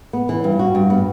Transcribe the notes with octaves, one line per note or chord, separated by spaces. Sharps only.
B3
E3
G2
F#4
G2
B3